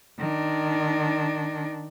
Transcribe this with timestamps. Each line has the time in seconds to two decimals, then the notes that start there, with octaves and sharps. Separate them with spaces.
0.18 D#3 D4